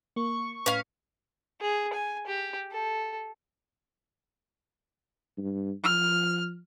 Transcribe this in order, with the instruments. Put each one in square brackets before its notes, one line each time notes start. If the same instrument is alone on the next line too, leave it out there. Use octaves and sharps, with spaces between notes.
[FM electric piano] A#3 [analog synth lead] C#6
[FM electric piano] A2 B4 [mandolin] C#4 F5
[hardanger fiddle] G#4
G#5
G4
A4
[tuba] G2
[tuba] F3 [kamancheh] F6